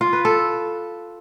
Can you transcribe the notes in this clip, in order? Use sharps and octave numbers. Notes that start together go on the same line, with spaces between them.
F4
B4
A4